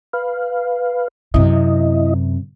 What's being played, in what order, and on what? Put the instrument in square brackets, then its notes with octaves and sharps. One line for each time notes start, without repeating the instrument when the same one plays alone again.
[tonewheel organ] B4 F5
[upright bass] F#2 C3 [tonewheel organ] E4 D#5